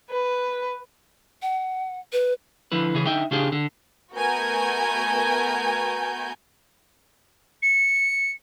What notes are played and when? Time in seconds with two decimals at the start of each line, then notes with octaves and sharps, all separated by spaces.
0.11 B4
1.42 F#5
2.12 B4
2.72 D3 F3 E4 B4
2.95 C#3 E3 G#4
3.06 D3 D#4 E5 G5
3.31 C#3 D4 F4 G4 G#4
3.52 D3
4.15 A3 B3 F#4 A#4 G#5 G6
7.62 C#7